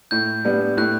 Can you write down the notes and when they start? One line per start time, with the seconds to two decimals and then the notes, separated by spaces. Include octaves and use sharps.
0.11 A2 G6
0.45 G3 B3 D4
0.77 A2 F#6